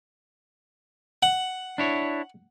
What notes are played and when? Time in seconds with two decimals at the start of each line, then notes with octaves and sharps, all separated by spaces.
1.23 F#5
1.78 D4 E4 C#5